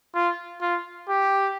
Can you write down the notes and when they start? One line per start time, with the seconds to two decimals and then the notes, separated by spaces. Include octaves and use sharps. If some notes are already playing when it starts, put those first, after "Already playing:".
0.15 F4
0.62 F4
1.09 G4